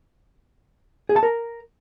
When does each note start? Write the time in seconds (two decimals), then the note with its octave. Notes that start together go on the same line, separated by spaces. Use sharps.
1.09 G#4
1.16 A5
1.23 A#4